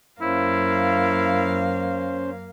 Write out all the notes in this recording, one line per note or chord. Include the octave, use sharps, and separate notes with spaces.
F#2 A#3 C#4 E4 C5 F5